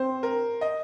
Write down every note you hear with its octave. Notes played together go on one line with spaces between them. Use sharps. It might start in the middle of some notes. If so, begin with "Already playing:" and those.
Already playing: C4 C5
A#4
D#5